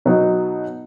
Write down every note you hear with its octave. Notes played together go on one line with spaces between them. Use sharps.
B2 F#3 B3 D#4 F#4